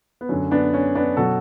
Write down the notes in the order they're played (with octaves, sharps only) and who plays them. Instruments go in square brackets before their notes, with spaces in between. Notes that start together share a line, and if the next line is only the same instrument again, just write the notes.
[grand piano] B3
F#2 D3 F#3 C#4
B3 D4
C#4
B3 D4
B2 F#3 F#4 A4